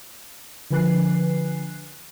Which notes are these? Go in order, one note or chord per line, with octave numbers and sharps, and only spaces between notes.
D3 F3 B4 G#5 F#6 C7